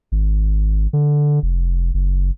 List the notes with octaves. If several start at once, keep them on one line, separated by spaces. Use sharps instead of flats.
G#1
D3
F1
F#1